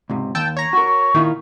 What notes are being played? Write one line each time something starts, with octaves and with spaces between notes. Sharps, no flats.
C#2 G#2 C3
D#2 G5 A5 E6
C#5 A#5
F#4 A#4 C#6
A#2 D#3 E4 F4